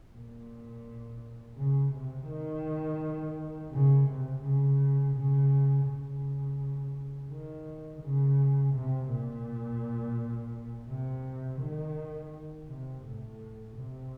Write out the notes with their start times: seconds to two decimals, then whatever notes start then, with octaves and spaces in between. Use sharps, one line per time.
0.13 A#2
1.57 C#3
1.92 C3
2.29 D#3
3.72 C#3
4.08 C3
4.44 C#3
5.15 C#3
5.87 C#3
7.30 D#3
8.02 C#3
8.74 C3
9.10 A#2
10.89 C3
11.61 D#3
12.69 C3
13.05 A2
13.76 C3